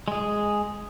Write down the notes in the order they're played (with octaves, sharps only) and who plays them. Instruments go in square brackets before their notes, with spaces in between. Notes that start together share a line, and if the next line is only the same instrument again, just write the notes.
[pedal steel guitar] G#3 G#4